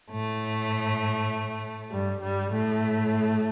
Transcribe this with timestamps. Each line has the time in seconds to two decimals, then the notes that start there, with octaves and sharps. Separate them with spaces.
0.12 A2 A3
1.91 G2 G3
2.21 G2 G3
2.51 A2 A3